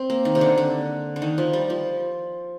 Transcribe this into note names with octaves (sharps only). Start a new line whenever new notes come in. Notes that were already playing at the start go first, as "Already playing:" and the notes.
Already playing: C4
A#3
D#3
C3
D3
D3
D3
D#3
F3
G3
F3